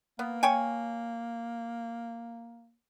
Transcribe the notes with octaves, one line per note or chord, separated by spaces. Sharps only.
A#3 B3
C#5 G5 G#5